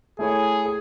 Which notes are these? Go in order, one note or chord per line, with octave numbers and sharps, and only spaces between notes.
A3 E4 G#4 A4 C#5
G#4